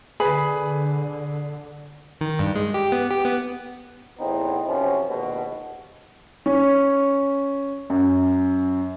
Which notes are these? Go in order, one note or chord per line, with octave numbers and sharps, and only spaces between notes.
D3 G#4 B4 G#5 B5
D#3
G2
G#3
G4
B3
G4
B3
E2 A2 B3 C4 D#4
F#2 C3 F3 C#4
A#1 D#2 G#2 B2
C#4
F#2